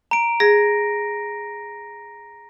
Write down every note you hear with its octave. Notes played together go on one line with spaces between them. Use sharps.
A#5 D7
G#4 A#6